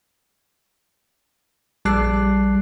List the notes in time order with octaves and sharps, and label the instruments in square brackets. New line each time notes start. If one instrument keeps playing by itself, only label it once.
[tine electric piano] A#1 G3 A5 D6 F#6 C7